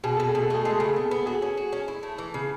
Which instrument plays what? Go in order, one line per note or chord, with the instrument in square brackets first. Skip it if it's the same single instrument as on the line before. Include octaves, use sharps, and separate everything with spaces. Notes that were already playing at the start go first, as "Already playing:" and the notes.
[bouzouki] B2 [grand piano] G#4
[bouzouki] B2 [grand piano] A4
[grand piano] G#4
[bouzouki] B2
[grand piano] A4
[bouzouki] A3 [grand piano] G#4
[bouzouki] G#3 [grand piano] A4
[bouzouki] C#3 [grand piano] G#4
[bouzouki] B3 [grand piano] A4
[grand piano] G#4
[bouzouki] B3
[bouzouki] F#4 [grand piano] G#4
[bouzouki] C#4
F#4
C#4
E4
A3
E3
C#3